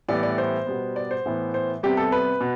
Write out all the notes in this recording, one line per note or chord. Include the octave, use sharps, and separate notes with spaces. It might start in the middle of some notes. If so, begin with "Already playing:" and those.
A2 E3 G3 B3 D5
D5
C5
B2 G3 B3
D5
C5
A2 E3 B3
C5
C3 G3 B3 G4
A4
B4
B2